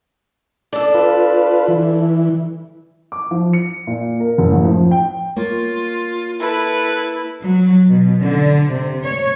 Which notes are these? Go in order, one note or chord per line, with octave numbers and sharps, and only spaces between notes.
D4 A4 D5
F4 B4
E3
D6
F3
C#7
A#2
A#4
F#1
A1
F3
G5
A#3 F4 C#5
E4 A4 B4
F#3
B2
D3
C3
C#5